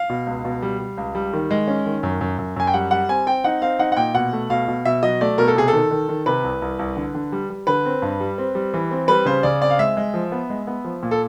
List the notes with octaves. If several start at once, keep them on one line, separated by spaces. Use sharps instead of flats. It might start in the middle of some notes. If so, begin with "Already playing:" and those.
Already playing: F5
B2
C#2
B2
G3
G3
C#2
G3
D#3
G#3
C#4
D#3
F#2
F#2
F#2
F#2 G#5
G5
G3 F#5
G3 F#5
C4 G#5
C4 G5
D#4 F#5
C4 F5
D#4 F#5
F#5
A#2 G5
B2 F#5
A3
B2 F5
B2
B2 E5
F#3 D#5
A3 D5
B2 A#4
A4
C3 G#4
A4
D#3
D#3
D#3
C3 B4
C2
C2
C2
D3
D3
G3
G3
D3 B4
C4
G2
G3
C4
G3
E3
C4
G3 B4
C#3 C5
C#3 D5
C4 D5
F5
G#3 E5
G#3
F3
B3
G#3
B3
F3
A#2
A4